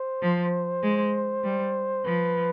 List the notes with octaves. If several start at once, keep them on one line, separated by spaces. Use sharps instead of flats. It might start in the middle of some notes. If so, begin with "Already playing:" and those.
Already playing: C5
F3
G#3
G3
F3 B4